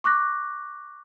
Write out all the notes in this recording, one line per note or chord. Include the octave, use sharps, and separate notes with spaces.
C#6 D6 F#6 A#6